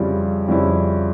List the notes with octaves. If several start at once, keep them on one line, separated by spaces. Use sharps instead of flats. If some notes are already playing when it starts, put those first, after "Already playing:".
Already playing: F2 C#3 G3 C#4 E4
F2 C#3 G3 C#4 E4